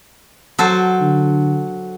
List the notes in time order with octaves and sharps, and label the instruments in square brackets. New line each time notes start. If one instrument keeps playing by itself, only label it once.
[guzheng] F#3 A4 C5
[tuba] D3